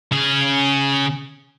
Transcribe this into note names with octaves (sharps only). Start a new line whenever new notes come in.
C#3 G#4